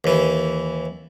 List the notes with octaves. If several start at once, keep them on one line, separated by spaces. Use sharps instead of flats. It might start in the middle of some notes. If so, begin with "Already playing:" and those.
D#2 E3